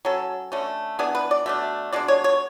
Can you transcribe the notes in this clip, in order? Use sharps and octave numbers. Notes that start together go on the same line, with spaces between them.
F#3 C#4 A4
D3 A3 C#4
E3 B3 D4 G#4
B4
D5
B2 A3 D4 E5
B2 G#3 D4 D5
C#5
C#5